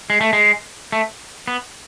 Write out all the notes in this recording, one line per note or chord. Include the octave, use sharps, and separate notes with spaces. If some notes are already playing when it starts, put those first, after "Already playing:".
G#3
A3
G#3
A3
B3